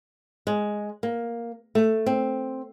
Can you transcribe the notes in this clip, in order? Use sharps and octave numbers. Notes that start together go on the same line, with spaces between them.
G#3
A#3
A3
C4